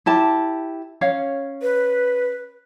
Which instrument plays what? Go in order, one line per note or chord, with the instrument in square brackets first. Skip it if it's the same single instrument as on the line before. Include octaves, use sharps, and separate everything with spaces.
[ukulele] E4 G4 A5
C#4 C#5 F5
[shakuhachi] B4